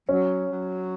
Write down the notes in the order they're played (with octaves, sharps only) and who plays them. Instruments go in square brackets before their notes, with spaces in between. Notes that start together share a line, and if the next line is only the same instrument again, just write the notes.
[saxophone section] F#3 [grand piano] C#4
[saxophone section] F#3